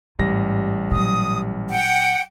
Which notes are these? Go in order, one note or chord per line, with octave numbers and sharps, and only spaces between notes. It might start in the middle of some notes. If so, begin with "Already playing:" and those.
A1 G#2 G3 A#6
A#2 F#3 D#6
F#5 G5